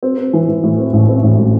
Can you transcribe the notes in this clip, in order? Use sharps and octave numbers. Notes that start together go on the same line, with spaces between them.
C4
C4
E3
E3
A2
C4
A1
C4
A1
A2